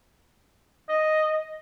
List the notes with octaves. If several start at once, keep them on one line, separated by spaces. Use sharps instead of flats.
D#5